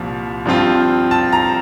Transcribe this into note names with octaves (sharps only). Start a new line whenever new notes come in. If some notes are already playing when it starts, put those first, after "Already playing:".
Already playing: C2 A#2 F3
G2 F3 C4 F4
A5
A#5